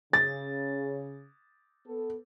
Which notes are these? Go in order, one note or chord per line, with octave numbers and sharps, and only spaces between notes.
C#3 A6
B3 A4